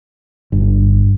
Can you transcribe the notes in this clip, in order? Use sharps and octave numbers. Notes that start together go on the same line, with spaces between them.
G1